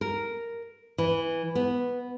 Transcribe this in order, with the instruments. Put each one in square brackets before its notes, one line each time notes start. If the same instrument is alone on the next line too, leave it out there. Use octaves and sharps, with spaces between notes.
[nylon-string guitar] A#4
E3
B3